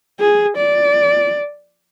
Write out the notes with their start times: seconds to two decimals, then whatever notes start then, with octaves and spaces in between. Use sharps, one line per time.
0.20 G#4
0.57 D5